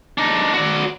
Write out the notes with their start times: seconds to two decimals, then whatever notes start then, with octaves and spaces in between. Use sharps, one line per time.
0.18 D4 D#4
0.54 F#4 D5